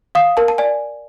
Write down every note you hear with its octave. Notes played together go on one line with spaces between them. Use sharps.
F5 D#6
A#4 A5
A5
D5 G#5